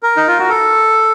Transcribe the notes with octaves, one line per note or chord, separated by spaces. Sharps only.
A#4
D#4
F4
F#4
A4